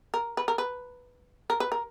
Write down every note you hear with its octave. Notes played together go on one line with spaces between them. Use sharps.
A#4
B4
A#4
B4
A#4
B4
A#4